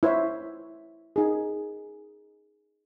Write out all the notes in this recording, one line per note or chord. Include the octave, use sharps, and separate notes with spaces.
E4 C5 C#5 E5
D#4 G#4